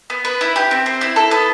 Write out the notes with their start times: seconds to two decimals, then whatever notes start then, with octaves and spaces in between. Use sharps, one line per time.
0.10 B3
0.25 B4
0.41 E4
0.56 G4
0.71 C4
0.86 C5
1.01 E4
1.16 A4
1.31 B3